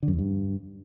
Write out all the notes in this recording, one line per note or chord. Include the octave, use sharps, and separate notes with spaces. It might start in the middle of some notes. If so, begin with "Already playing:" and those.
D3
F#2
E2
G2